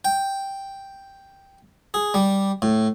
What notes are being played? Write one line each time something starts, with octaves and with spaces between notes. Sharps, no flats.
G5
G#4
G3
A2